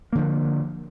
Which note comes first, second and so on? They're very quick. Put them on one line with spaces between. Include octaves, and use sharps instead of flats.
A#3 D3 F3